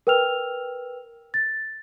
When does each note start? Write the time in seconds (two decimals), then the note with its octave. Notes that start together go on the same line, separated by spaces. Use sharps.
0.07 A#4 B4 G5 E6 F6 F7
1.34 A6